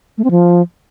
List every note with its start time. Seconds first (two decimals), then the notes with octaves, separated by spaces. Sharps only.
0.18 A3
0.24 C4
0.31 F3